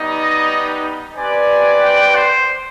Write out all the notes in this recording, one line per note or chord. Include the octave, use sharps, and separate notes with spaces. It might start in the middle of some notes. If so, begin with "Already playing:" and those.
Already playing: G3 B3 D#4
D#5
C4 G4 B4 D5 G#5
G5
C5